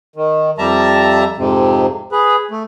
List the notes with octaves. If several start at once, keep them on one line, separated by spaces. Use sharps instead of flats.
D#3
F2 G3 E5 A5 A#5
F2 G#2 C3
G#4 B4
A3